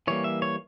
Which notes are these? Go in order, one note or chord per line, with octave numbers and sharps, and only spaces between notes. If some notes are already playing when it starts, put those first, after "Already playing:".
E3 G3 A#3 C#5
E5
C#5